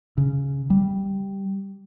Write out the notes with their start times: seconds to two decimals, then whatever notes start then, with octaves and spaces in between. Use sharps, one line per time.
0.17 C#3
0.70 G3